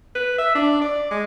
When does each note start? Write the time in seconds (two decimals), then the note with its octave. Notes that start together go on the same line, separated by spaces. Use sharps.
0.15 B4
0.38 E5
0.55 D4
0.81 D5
1.11 G#3